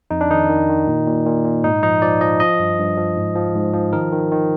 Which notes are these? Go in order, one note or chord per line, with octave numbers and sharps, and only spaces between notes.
F2 D#4
D4
D#3 D#4
D#3
D#3
A#2
A#2
A#2
A#2
G#2 D#4
F3 D#4
F3 D5
F3 D#5
F3 D#5
G2
G2
F3
G#2
F3
G#2
F3
D#3 A#4
D#3
D#3